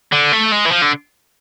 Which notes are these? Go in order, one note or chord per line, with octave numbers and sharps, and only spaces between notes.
D3
A3
G#3
E3
F3
D3